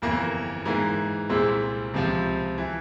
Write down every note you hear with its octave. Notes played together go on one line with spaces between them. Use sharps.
G1 F2 E3 A#3
G#2 E3 A#3
C2 A#2 G#3 C4 E4
C#2 C3 F3 C4
E3